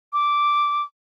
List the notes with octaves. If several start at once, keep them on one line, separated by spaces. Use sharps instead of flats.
D6